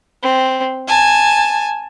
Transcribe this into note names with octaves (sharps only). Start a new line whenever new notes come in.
C4
G#5 A5